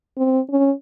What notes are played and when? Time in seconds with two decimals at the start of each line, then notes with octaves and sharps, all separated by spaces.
0.17 C4
0.50 C#4